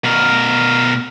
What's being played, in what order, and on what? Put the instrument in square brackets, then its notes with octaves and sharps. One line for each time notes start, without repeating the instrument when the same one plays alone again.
[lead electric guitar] B2 A#4